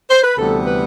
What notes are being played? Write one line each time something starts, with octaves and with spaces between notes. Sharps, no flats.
C5
B4
D2 C3 E3 G3 B3 A4
B4